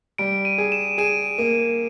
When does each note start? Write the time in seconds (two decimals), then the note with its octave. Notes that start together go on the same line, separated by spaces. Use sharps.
0.18 G3 D7
0.45 D#7
0.58 G#4
0.72 E7
0.98 G#4 D#7
1.38 A#3